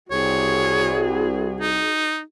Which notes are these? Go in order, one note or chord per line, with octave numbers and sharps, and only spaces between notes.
C2 F#4 G#4 C#5
D#4